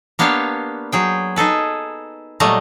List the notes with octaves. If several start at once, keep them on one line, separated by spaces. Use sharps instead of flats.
A#3 B3 D4 G4 C#5 F5
F#3 G#4 G5
D#4 G#4 A4 B4
A#2 F#3 G3 A3 D#5